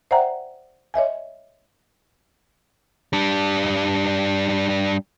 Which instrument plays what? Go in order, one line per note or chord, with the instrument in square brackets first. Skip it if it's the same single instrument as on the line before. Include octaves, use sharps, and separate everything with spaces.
[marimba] C5 D5 E5 F#5 G5 A#5
C#5 D#5 E5 G#5
[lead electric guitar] G3 D4